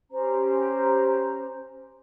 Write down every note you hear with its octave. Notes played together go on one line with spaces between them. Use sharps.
C#4 G4 C5 A#5